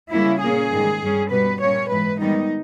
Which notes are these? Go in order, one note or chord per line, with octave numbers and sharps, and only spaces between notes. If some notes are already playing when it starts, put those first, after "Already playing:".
C#3 G3 A#3 C#4 E4
A#2 A#3 C#4 G#4
G#2 D#3 G3
G2 G3 C#4
B2 G3 B3 B4
A#2 G3 A#3 C#4 C#5
G#2 E3 G#3 B4
G#2 D#3 G3 B3 D#4